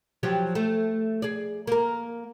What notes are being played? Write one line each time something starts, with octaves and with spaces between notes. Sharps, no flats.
F3 F#3 G4
A3
G#4 D5
A#3 A#4